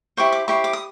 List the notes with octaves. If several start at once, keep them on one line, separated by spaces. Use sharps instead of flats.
E4 G4 C5 C#6
D6
E4 G4 C5 C#6
D6
D#6